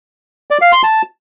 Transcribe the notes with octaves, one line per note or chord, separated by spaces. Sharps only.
D5
F5
C6
A5